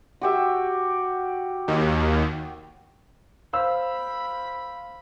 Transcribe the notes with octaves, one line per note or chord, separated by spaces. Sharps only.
F#4 G4 E5
D#2
C5 F5 B5 E6